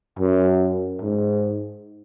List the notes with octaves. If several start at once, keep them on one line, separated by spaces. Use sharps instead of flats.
F#2
G#2